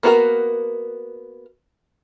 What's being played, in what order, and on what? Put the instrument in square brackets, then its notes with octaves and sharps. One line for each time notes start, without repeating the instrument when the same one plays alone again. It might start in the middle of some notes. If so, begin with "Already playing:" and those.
[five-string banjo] A#3 B3 F#4 A4 A#4